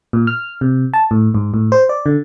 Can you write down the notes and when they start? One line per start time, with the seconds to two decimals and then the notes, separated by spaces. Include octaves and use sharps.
0.13 A#2
0.27 F6
0.61 C3
0.94 A5
1.11 A2
1.34 G#2
1.54 A2
1.72 C5
1.89 D5
2.06 D3